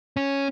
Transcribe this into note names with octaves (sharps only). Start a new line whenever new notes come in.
C#4